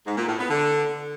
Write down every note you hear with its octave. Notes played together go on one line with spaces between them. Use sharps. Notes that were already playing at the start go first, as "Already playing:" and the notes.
G#2
A#2
A2
B3
D3